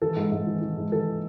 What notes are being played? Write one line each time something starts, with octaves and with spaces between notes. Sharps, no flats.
E3 A4
G#2
G#2
E3
E3
G#2
E3 A4